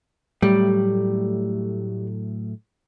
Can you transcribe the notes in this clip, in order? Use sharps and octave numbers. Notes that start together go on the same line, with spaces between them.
A2 F#3 G3 A3